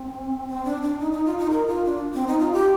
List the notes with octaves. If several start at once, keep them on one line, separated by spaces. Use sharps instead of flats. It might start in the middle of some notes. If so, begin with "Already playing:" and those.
Already playing: C4
C4
D4
D4
D#4
D#4
F4
D#4
A#4
F4
D4
C4
D#4
F4
G4